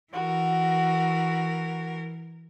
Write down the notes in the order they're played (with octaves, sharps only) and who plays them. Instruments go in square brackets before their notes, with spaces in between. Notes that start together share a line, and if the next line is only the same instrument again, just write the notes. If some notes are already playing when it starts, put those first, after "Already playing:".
[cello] E3 A#4 [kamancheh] F#4